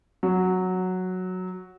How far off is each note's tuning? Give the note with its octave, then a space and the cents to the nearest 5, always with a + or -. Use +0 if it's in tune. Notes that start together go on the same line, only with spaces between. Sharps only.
F#3 -5